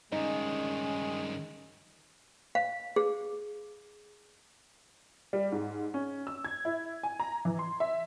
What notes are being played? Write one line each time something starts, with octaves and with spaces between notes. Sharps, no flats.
G2 D#3 G#3 C#4 D#4
F5
G#4
G3
G#2
C#4
E6
G#6
E4
G#5
A#5
E3
C6
E5